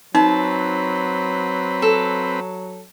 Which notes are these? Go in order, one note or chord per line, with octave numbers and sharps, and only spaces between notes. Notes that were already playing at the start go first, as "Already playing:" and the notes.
F#3 C4 D#4 B4 A5
A4